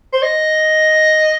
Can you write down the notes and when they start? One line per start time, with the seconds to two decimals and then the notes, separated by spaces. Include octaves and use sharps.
0.13 C5
0.23 D#5